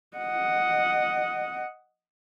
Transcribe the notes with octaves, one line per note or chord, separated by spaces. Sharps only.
D#5 F#5